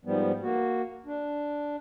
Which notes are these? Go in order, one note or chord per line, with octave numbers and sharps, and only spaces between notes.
G#2 F3 G3 B3
A#3 F#4
D4